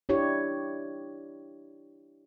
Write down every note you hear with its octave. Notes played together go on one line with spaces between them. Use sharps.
D4 E4 G4 C#5